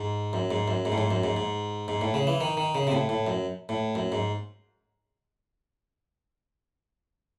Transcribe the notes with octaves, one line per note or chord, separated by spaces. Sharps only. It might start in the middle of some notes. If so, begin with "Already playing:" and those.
Already playing: G#2
F#2
G#2
F#2
G#2
A2
G#2
F#2
G#2
G#2
G#2
A2
C#3
E3
D#3
D#3
C#3
C3
A2
A2
F#2
A2
F#2
G#2